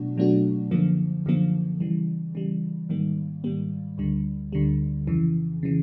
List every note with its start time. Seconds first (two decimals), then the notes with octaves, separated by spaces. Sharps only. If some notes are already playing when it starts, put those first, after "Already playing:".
Already playing: B2 F#3 A3 D4 F#4
0.18 B2 F#3 A3 D4 F#4
0.71 F#2 D3 F3 A#3
1.26 F#2 D3 F3 A#3
1.80 C#3 E3 G3
2.35 C#3 E3 G3
2.89 G#2 D#3 G3 A#3
3.44 G#2 D#3 G3 A#3
3.98 D2 D3 G3
4.52 D2 D3 G3
5.07 F2 C#3 E3
5.63 C#3 E3